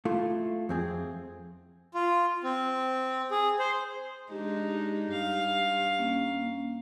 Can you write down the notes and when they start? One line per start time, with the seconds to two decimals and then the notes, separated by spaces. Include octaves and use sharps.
0.05 A3 E4 F4
0.69 F2 C4 G#4
1.94 F4
2.44 C4
3.31 G#4
3.59 C5
4.31 G#3 D4 D#4 G4
5.12 G2 F5
5.99 A#3 C#4